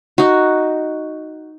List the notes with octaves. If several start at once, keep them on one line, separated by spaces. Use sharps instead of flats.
D#4 F#4